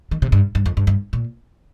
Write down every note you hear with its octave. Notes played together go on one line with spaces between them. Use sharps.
D#3
C3
G2
G2
F2
G2
G2
A#2